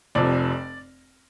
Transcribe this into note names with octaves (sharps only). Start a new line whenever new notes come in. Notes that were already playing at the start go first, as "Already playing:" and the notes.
F1 F2 C3 F3 D5